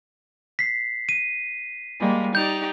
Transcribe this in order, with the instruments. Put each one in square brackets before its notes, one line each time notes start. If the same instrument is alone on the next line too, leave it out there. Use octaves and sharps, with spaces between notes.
[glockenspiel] B6 C7
D#7
[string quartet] G3 G#3 A#3
[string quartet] D#4 G4 D5 [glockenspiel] G6 F7